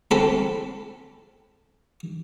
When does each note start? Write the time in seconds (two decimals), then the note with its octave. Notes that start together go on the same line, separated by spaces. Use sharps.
0.11 C4 A4 B5